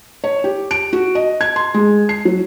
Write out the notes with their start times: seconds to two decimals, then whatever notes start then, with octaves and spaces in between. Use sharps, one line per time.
0.24 C#5
0.44 G4
0.71 D7
0.93 F#4
1.15 D#5
1.41 G#6
1.56 C6
1.74 G#3
2.09 C7
2.25 F#3